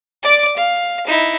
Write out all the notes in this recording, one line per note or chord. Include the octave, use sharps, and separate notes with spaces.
D5 D6
F5
D#4 E4